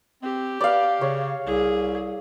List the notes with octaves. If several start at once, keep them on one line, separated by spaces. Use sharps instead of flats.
C4 G4
B4 D5 F5
C#3 C#5
C2 G#4